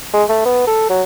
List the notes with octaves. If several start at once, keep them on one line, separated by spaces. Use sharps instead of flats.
G#3
A3
B3
A4
F#3